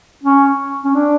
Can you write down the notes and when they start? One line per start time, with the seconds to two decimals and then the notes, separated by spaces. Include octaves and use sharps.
0.24 C#4
0.84 C#4
0.95 D4